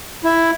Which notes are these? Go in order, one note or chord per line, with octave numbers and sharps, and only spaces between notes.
E4